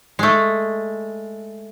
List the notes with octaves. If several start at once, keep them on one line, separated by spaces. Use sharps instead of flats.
G#3 A3